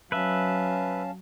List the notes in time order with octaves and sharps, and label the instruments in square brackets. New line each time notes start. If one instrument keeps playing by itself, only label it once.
[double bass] F#3 [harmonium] C#4 F5 A5 [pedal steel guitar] B4 E5